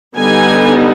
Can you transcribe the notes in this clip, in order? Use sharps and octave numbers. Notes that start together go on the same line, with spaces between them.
D3 G3 B3 D#4 G#5